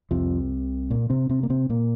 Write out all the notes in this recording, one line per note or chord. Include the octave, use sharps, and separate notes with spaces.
C2 F2 C3 F3
A#2 A#3
C3 C4
C3 C4
A#3
C3 C4
A#2 A#3